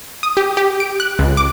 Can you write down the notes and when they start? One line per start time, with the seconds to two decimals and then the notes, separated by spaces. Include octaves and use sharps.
0.23 D#6
0.37 G4
0.57 G4
0.80 D7
1.00 F#6
1.19 C#2
1.37 D6